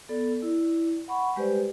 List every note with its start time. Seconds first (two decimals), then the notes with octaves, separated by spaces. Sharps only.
0.09 B3 A4 D5
0.42 E4 D5
1.08 F#5 B5 C#6
1.36 G3 G#3 G4 B4 C5 D5